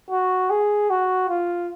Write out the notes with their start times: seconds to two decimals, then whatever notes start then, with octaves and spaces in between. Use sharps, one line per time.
0.10 F#4
0.50 G#4
0.90 F#4
1.29 F4